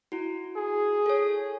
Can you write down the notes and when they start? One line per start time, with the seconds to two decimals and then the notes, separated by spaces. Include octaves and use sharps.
0.12 E4 F#4
0.57 G#4
1.06 A4 C#5